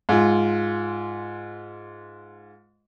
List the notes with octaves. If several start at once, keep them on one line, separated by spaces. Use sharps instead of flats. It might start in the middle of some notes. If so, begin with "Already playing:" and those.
G#2 F4